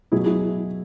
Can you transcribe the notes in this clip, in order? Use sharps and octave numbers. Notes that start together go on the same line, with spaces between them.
B2 F#3 E4 G#4
E4 G#4